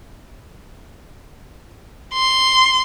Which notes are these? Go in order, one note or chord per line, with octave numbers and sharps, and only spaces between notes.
C6